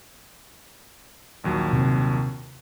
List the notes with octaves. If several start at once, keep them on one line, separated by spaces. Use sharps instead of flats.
A#1 D#2 F#3
C3